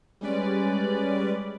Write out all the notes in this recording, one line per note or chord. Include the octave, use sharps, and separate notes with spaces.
G3 G#3 C#4 B4 D5